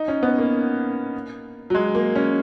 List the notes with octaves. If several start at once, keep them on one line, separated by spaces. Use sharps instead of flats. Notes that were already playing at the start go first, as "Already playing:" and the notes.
Already playing: D#4
C#4
B3
A#3
F#3
G#3
A#3
C#4